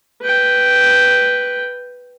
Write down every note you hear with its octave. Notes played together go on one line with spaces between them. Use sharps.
B4 G5